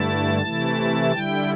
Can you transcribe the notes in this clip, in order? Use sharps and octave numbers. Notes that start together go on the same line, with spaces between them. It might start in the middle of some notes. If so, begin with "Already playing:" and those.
Already playing: G2 D3 A3 E4 A5
C3 E3 A3 E4
D3 G3 E4 G5